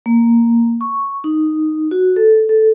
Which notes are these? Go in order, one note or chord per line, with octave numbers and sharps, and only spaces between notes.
A#3
C#6
D#4
F#4
A4
A4